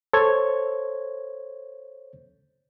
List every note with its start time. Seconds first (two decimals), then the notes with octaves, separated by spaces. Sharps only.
0.13 A4 C5 C#5 G#6